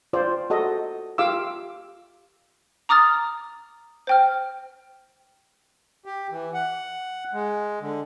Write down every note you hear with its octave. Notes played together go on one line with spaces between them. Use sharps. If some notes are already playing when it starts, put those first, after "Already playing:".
F4 C5 D5
F#4 A4 D#5
F4 G4 F5 D6 E6
A#5 D6 D#6 F6 A6
C5 G5 F6
G4
E3
F#5
G#3
D3